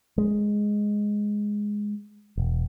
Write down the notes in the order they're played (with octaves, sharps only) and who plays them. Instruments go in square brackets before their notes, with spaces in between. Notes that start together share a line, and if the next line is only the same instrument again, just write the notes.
[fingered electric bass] G#3
E1